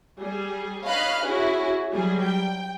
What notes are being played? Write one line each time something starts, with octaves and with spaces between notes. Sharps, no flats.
G3 G#4
C#5 D#5 F5 B5 F6 F#6
C#4 E4 F#4 G#4
F#3 G3 G#4
G5